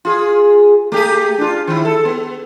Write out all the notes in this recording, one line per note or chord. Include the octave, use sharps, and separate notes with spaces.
F4 G#4
A3 G4 G#4
D4 F4
D#3 E4
A4
B3